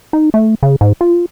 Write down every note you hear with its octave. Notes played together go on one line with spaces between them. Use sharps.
D#4
A3
C#3
G#2
F4